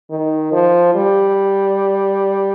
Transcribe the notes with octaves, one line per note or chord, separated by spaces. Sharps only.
D#3
F3
G3